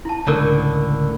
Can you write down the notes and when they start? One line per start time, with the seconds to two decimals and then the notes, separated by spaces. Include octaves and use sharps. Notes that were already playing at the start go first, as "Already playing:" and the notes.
0.05 E4 A5
0.27 C#2 A2 D3 A#4 C#5